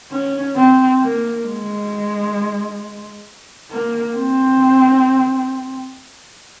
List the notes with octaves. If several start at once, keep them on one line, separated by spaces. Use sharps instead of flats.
C#4
C4
A#3
G#3
A#3
C4